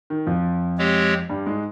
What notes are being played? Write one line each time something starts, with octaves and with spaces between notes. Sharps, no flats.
D#3
F2 F3
G#3 C4 G4 C#5
G2 G3
G#2 G#3